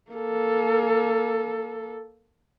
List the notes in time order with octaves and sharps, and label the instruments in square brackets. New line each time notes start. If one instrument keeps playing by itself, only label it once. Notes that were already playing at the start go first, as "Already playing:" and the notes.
[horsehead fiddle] A#3 A4